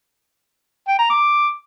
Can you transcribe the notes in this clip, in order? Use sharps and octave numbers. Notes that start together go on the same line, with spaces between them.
G5
A#5
D6